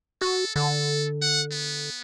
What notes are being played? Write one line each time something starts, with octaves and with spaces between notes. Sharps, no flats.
F#4 A4
D3 A4
F#5
B3